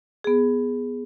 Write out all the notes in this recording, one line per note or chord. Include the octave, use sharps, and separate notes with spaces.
B3 G#4